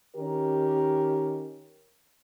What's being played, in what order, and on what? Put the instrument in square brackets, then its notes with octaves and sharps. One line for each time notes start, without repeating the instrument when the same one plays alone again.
[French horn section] D#3 C#4 G4 A#4